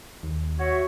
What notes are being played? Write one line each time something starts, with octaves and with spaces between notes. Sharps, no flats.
D#2
F#4 C#5 E5